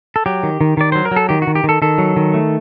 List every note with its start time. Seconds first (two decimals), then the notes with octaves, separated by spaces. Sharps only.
0.16 A4
0.26 F#3 G4
0.43 D#3
0.61 D#3
0.77 D#3 D5
0.92 F#3 C5
1.05 A#4
1.11 F#3
1.16 A4
1.29 D#3 G4
1.42 F#4
1.47 D#3
1.55 G4
1.64 D#3
1.69 A4
1.82 D#3 A4
1.98 F#3
2.16 D#3
2.34 A3